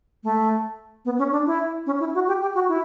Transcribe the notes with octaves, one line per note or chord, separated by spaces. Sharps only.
A3
B3
C#4
D4
E4
C#4
E4
F#4
G4
G4
F#4
E4